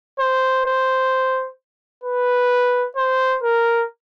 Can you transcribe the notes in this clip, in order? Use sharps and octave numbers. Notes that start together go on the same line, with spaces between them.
C5
C5
B4
C5
A#4